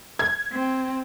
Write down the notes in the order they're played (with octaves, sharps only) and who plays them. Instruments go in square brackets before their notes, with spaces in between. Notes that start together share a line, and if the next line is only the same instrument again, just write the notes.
[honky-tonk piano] G#6
[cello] C4